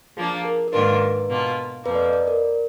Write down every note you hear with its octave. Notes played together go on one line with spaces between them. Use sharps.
F3 A#3 D4 G#4
A#4
A#4
G#2 D#3 A#3 D4 F4 B4
B2 A#3 F4
F2 F3 A#3 B4
D5
D#5
D5
A#4